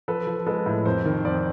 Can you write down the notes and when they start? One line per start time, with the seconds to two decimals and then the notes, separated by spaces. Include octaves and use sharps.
0.08 F3 A4 B4
0.27 F3
0.46 G#3 A4 B4
0.66 A2
0.85 F2 A#4 C5
1.05 D#3
1.25 F2 C5 D5